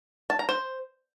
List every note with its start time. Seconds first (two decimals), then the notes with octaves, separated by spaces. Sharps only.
0.30 A5
0.39 A#5
0.49 C5